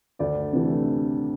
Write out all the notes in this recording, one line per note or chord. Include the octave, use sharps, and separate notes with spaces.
D2 D5
C3 E3 A3